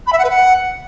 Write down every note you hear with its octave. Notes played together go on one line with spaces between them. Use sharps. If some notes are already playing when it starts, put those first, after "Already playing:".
B5
E5
F#5
B4
F#5